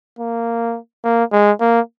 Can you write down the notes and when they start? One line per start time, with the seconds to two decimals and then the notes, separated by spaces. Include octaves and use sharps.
0.19 A#3
1.04 A#3
1.32 G#3
1.60 A#3